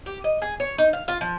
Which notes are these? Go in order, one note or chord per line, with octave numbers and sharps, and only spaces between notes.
G4
D#5
G#4
C#5
D#4
F5
F4
F3